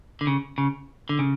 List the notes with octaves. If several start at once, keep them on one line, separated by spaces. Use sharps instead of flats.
D3
C#3
C#3
D3
C#3